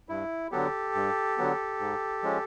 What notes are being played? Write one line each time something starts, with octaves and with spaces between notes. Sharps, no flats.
G2 E4
D3 F#3 B3 G4 A4
G2
D3 F#3 B3
G#2
F3 G#3 C#4